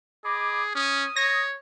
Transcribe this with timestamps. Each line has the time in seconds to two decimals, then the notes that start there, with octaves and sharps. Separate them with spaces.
0.24 G#4 D#5 B5 D6
0.75 C#4 D#6
1.16 C#5 A#6